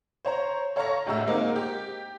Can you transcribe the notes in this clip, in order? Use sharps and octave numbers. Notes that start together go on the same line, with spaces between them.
C5 C#5 A#5
A4 C#5 F5 A#5 C#6 A#6
D2 A2 G#3 E5 A#5 E6
G#3 A#3 C4 D#4 F#4 A#4
G4